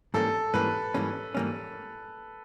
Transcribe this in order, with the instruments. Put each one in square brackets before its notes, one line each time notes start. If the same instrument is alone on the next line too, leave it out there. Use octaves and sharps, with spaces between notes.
[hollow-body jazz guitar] G#2 E3 G3 A#3 C#4 [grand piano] A4
[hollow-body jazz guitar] G#2 E3 G3 A#3 C#4 [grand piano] B4
[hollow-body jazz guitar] G#2 E3 G3 A#3 C#4
G#2 E3 G3 A#3 C#4